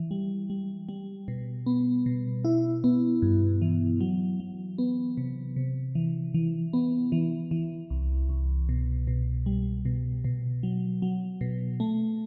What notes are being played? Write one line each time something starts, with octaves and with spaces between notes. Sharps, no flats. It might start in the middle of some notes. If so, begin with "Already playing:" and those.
Already playing: E3
G3
G3
G3
B2
B3
B2
E4
B3
G2
E3
F#3
F#3
B3
C3
C3
E3
E3
B3
E3
E3
C2
C2
B2
B2
G3
B2
B2
F#3
F#3
B2
A3